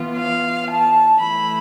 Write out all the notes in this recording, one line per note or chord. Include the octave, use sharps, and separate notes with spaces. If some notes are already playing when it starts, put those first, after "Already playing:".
Already playing: E3 B3 F4
F5
A5
E3 A3 E4 B5